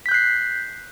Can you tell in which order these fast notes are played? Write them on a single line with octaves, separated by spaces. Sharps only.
B6 G6 F#6 C7